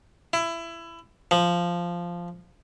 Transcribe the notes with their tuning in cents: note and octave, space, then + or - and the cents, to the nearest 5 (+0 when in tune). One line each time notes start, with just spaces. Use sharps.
E4 +20
F3 -5